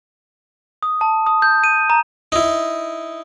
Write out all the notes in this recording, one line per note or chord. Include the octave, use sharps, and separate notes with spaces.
D#6
A5
D#6
G6
D#7
A#5
D#4 E4